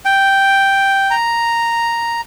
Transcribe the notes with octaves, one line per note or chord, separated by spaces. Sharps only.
G5
A#5